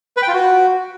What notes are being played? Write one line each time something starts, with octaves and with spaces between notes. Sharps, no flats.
B4
G5
F4
F#4